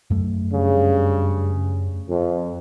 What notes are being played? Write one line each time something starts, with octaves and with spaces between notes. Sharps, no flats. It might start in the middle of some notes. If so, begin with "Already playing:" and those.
F#2 A3
G2 C#3
F2